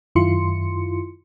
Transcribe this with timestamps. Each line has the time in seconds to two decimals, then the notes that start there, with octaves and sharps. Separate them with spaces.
0.15 F#2 D#3 E4 F4 C6 C#7